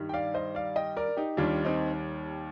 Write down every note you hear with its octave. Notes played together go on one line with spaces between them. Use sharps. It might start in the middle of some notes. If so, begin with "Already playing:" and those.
Already playing: G2 D#3 G3
G5
D5 F5
C5 D#5
D5 F5
D#5 G5
A#4 D5
D#4 G4
D#2 D#3 G3 D4 F4
C4 D#4